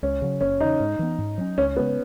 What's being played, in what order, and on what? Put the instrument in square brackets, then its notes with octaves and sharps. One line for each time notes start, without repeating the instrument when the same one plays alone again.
[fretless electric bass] C#2 [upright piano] C#4
[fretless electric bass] C#3 F#3
[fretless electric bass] F#1 [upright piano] C#4
[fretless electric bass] E2 C#3 [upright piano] D#4
[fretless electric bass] G#2
E3 B3
G#2
F#3 C#4
[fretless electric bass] C#2 [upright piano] C#4
[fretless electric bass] G#3 [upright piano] B3
[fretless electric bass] C#3